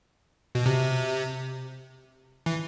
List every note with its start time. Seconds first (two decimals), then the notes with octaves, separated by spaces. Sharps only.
0.55 B2
0.66 C3
2.46 E3